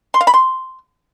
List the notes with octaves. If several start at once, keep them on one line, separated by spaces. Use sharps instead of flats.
C6
F5
B5
C6